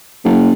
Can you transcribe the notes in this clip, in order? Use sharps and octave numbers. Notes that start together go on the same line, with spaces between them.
F#1